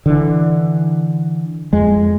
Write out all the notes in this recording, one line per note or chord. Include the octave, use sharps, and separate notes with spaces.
D3 E3
F2 G#3